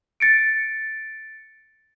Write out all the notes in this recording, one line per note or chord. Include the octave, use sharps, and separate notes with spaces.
A6 C#7 D7